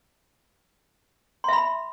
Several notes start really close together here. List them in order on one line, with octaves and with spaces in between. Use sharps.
C6 E5 B5